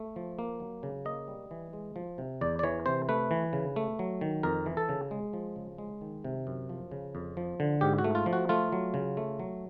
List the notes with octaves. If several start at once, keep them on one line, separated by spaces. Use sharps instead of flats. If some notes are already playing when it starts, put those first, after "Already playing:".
Already playing: A3
F3
A#3
F#3
C#3
A#3 D#5
G3
E3
G#3
F3
C3
E2 D5
D5
E3 C#5
C3 C5
A3 B4
E3
C#3
A3
F#3
D#3
F2 A#4
E3
A4
C#3
G#3
F3
C#3
G#3
D#3
C3
F#2
F3
C#3
F2
F3
D3
G#2 G4
F#4
A3
F4
F3
F#4
A3 F4
F#3
C#3
A3
F#3